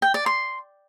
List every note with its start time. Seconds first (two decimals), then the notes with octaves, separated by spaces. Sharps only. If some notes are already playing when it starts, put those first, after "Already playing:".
0.02 G5
0.14 D5
0.26 C6